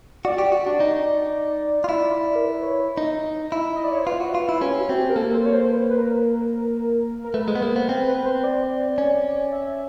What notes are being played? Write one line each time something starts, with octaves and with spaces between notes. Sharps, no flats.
F#4 D5
G4
F#4
D4
D#4
F4
E4
A#4
B4
C#5
D#4
E4
D#5
D5
C#5
C5
F4 B4
F#4
F4
E4
C#4 G4
F#4
C4
G4
A#4
A#3 A4
C5
C#5
C5
B4
B4
A#4
A#4
A3 B4
G#3 C5
B3
A#3 B4
B3 C5
C4 B4
B4
C5
D5
C#4
E5